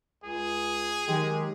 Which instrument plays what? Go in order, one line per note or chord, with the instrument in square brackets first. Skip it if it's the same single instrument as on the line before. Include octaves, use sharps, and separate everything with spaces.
[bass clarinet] C#2 [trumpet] G#4
[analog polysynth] D#3 G#3 G4 [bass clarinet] F#3